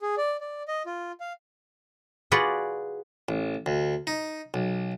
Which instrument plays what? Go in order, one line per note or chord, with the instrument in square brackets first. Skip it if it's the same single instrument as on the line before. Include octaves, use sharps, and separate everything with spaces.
[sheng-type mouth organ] G#4
D5
D5
D#5
F4
F5
[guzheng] F4 F#4 G#4 B4 D5 F#5
[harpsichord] A1
D2
D#4
B1